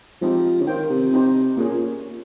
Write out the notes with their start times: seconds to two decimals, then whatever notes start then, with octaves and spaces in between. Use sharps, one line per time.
0.21 F3 G#3 C4 D#4 G4
0.62 C#3
0.67 D#3 F4 C5 G5
0.90 C3
1.12 C4 D#4 G4 C5
1.57 A#2 A#3 C#4 G#4
1.68 A#2